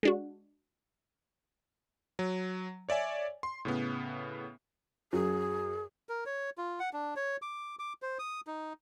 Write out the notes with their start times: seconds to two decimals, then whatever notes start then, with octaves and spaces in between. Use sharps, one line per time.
0.03 G#3 D4 F#4
2.19 F#3
2.89 C#5 D5 E5 G#5
3.43 C6
3.65 A2 C#3 B3
5.13 F#2 F#3 G#4
6.09 A#4
6.26 C#5
6.58 F4
6.80 F#5
6.93 D4
7.16 C#5
7.42 D6
7.79 D6
8.02 C5
8.19 D#6
8.47 D#4